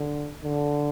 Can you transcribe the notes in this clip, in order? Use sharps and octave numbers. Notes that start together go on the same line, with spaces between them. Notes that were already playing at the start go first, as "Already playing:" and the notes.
Already playing: D3
D3